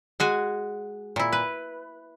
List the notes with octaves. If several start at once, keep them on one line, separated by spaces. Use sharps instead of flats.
G#3 F#4 G#5
A#2 E4
B4